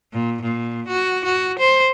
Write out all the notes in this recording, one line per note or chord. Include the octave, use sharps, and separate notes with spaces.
A#2
A#2
F#4
F#4
C5